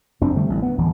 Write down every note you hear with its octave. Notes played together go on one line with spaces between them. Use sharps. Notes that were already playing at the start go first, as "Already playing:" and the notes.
F1 F#2 C4 D4
D3 G3 A3
A1
B3
D1 D2 E3